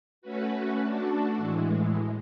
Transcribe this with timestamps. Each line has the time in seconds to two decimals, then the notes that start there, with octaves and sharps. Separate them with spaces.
0.22 A3 C#4 F#4 B4
0.79 A3 D4 F#4 A4
1.37 A2 E3 G#3